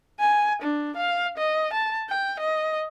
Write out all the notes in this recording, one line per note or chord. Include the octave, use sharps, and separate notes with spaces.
G#5
D4
F5
D#5
A5
G5
D#5